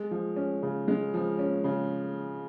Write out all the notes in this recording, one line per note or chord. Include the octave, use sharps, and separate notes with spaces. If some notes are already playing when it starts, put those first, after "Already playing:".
Already playing: G#3
F3
C#4
C#3
G#3
F3
C#4
C#3